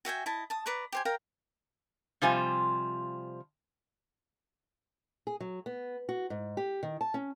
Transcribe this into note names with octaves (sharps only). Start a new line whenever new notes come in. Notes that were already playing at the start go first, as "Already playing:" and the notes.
F#4 E5 G5 G#5
E4 D#5 A5
A5 D#6
B4 D5 A#5 C#6
G4 C5 G#5
A#4 F5 G5 A#5
C3 F3 G3 F4 C5 G#5
G#4
F#3
B3
F#4
G#2
G4
D#3
A5
C#4